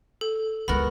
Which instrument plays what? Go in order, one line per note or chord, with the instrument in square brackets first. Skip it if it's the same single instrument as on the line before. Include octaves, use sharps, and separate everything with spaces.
[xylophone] A4
[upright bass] C#2 G#3 [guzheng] B3 F#4 A#4 [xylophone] B5